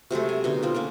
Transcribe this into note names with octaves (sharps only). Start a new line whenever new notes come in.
C3 F#3 G#3 A3
G#5
B2 D3 D#4
C4 F4
A#3 C#4 D4 A#4